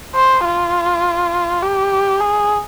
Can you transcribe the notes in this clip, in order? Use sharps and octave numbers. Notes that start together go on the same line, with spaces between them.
C5
F4
G4
G#4